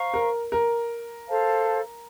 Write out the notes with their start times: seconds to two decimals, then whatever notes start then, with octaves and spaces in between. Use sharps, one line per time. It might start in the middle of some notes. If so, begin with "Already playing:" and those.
Already playing: C5 F5 A#5 C#6
0.14 A#4
0.52 A#4
1.27 A4 C5 F5 A5